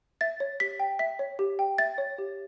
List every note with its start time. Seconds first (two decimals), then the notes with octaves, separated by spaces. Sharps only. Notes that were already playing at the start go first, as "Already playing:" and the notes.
0.21 E5 A6
0.40 C#5
0.60 G4 B6
0.80 G5
0.99 E5 B6
1.19 C#5
1.39 G4
1.59 G5
1.78 E5 A6
1.98 C#5
2.18 G4